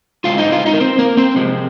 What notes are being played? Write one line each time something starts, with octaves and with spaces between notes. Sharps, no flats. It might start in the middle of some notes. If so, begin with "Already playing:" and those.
D3 G#3 C4 F4 F5
D#4 D#5
F4 F5
D#4 D#5
A#4
C4 C5
A#3 A#4
C4 C5
C3 F3 G#3 C4